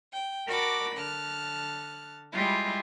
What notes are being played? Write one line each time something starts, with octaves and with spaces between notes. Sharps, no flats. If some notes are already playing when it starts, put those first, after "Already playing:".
G5
F#4 A#4 D5 A5 B5 D6
D3 A5 F6 F#6
G3 G#3 E4 F4 G4